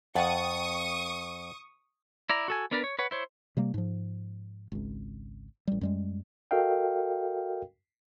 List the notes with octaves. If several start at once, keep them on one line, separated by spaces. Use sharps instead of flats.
F2 F#5 G5 A5 C#6 D#6
E4 D5 A#5
F#4 A4 G#5
B3 D4 A#4 B4 D5
C#5
B4 C#5 F#5
E4 C5 C#5
C3 G3 A#3
G#2 F3
G#1 C#2
A1 G3
F#2 G3 G#3
F#4 A4 A#4 D#5 F5 G5